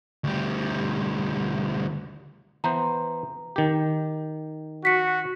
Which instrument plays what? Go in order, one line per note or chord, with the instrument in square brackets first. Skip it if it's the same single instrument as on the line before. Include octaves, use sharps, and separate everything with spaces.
[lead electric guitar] D2 G3
[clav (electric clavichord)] E3 B3 C5 [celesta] A#5
[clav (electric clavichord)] D#3 G4
[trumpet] F#4 [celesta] B6 C#7